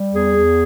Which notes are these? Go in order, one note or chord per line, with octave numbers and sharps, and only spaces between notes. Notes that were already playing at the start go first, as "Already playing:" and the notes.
Already playing: G3
E2 G#4
E2